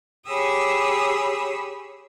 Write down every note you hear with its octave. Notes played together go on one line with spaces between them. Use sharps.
G4 G#4 C#5 B5 D#6 E6